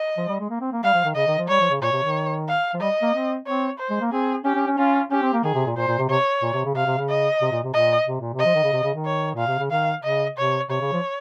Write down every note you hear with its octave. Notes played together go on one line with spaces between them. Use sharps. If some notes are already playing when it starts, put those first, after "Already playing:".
Already playing: D#5
F3
G3
G#3
A#3
C4
A#3
G3 F5
F3
D#3
C#3 D#5
D#3
F3
G3 C#5
F3
C#3
A#2 C#5
C3
D#3
F5
F3
G3 D#5
A#3
C4
C4 C#5
C5
G#3
A#3
C4 G#4
C#4 G4
C#4
C#4
C#4 F4
C#4 G4
C4
A#3
D#3 G#4
C3
A#2
A#2 C5
A#2
C3
C3 C#5
A#2
C3
C#3
C3 F5
C3
C#3
D#5
C3
A#2
C3
A#2 D#5
C3
A#2
C3
D#5
F3
D#3
C#3
C3
C#3
D#3
C#5
A#2 F5
C3
C#3
D#3 F5
C#3 D#5
C3 C#5
C3 C#5
C#3
F3